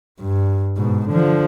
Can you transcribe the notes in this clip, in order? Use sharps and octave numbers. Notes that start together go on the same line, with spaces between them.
G2
G#2 B2
D3 F3